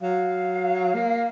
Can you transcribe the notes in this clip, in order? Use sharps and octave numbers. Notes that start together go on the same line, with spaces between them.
F#3 F5
A#3